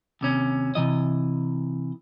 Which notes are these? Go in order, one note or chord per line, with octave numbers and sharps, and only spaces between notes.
D#2 C3 C#4
C3 E3 D#5